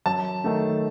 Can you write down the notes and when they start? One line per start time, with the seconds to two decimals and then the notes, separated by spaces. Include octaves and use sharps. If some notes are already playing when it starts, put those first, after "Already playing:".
0.06 F#2 A5
0.44 D#3 A3